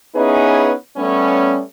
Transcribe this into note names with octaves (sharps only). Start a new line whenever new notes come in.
B3 C#4 D#4 E4 G#4 B4
G3 A3 B3 C#4